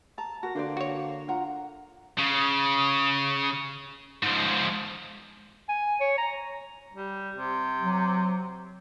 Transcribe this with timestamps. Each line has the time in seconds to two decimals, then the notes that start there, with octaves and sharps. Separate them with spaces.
0.18 A5 A#5
0.43 F#4 A#4 A#5
0.55 D3 A#3 B4 C5 D5
0.77 F#4 C#5
1.28 F4 F#5 A#5
2.19 C#3
4.23 G#2 F3
5.69 G#5
6.00 C#5
6.18 A#5
6.93 G3
7.36 C3
7.82 F#3